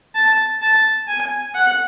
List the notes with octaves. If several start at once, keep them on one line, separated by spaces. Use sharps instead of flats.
A5
A5
G#5
F#5